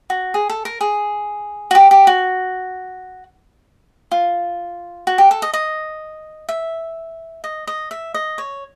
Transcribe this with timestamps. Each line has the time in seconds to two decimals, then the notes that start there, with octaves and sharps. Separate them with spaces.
0.10 F#4
0.34 G#4
0.49 A4
0.65 A#4
0.81 G#4
1.71 F#4
1.75 G4
1.91 G4
2.07 F#4
4.11 F4
5.07 F#4
5.18 G4
5.31 A4
5.42 D#5
5.53 D#5
6.49 E5
7.44 D#5
7.67 D#5
7.91 E5
8.14 D#5
8.38 C#5